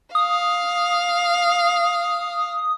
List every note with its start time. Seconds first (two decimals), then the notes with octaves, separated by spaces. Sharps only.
0.15 F5 D#6